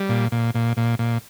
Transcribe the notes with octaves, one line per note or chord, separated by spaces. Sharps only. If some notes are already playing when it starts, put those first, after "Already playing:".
Already playing: G3
A#2
A#2
A#2
A#2
A#2